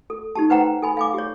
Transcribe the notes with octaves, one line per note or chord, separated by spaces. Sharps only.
A4
D#4 G4 A5
B4 C5 F#5 G5 A#5
A4 G#5 B5
F5 G#5 D6
G4 C#5